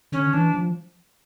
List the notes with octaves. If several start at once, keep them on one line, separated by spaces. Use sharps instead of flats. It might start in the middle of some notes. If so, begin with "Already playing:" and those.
D3 C#4
E3 D4
F3